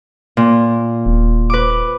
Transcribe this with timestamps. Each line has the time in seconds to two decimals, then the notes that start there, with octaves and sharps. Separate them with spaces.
0.37 A#2
1.06 D#1
1.50 B4 D6